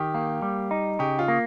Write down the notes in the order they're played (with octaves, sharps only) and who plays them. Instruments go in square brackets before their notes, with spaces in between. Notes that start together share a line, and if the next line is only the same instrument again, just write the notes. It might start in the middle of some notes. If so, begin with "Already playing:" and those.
Already playing: [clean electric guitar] D#3 [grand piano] G4
[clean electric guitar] A#3
G3
D#4
[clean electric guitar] C#3 [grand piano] G4
[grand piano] F4
[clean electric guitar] A#3